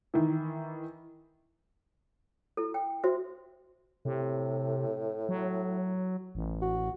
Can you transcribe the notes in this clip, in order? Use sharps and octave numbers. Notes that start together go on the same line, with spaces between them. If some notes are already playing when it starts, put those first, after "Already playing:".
D#3 E3
E4 A4
G5
F#4 C5 E5
A2 C3
F#3
A1
F#4